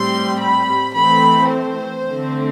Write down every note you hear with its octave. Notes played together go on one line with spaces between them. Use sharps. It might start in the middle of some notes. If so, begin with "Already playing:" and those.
Already playing: A2 G3 C4 C6
B5
E3 A3 C4 B5
C5
D3 A3 C4